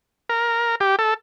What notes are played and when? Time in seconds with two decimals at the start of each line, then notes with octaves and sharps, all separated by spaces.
0.29 A#4
0.80 G4
0.99 A4